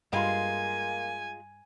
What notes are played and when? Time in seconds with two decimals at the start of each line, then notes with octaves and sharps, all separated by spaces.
0.13 G2 G#3 A#3 F4 G#5